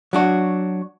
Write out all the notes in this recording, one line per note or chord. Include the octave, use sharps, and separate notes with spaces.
F#3 D4 F#4